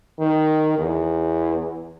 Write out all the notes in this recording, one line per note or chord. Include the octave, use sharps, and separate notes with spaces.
D#3
E2